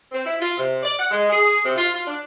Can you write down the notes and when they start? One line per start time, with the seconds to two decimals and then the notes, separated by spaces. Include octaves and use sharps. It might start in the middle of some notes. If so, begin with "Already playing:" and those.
0.11 C4
0.24 E4
0.38 F4
0.56 C3
0.81 D5
0.98 F#5
1.11 G#3
1.29 G#4
1.63 C3
1.75 F4
1.92 F4
2.06 D4